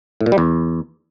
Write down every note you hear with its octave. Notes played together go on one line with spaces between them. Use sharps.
A2
A#2
G3
E2